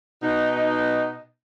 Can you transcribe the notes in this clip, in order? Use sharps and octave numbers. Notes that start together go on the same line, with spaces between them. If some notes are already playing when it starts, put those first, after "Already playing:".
B2 D#4